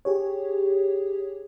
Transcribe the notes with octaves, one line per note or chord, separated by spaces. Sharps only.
G4 G#4 C#5